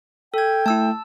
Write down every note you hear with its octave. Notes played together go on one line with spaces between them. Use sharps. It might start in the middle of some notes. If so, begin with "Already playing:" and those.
A4 G5 G#6
A3 E4 A5 E6